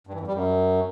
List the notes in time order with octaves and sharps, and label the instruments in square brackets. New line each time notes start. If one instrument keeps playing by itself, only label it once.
[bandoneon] G2
E3
F2
G3
F#2